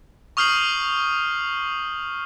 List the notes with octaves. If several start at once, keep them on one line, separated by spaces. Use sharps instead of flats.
C#6 D#6 F6 G6 C7 F#7